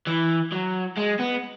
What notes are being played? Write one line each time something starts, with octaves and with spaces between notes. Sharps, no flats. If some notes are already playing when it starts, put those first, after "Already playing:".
E3
F#3
G#3
B3